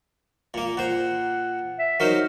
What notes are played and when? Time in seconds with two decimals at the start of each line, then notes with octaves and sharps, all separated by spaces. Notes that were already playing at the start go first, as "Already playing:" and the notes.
0.54 A#2 A#3
0.77 A#2 C5 F#5
1.79 E5
2.00 F#3 D#4 A#4 C5